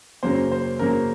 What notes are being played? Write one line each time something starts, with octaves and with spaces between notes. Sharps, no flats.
F#2 C#3 F#3 A#3 C5
C5
F#2 C#3 F#3 A#3 A#4